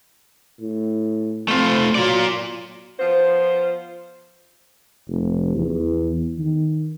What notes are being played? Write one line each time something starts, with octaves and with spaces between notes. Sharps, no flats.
A2
A3 C4 F4
F#3 F4 D5
F3 B3 F4 C5
F1
E2
D#3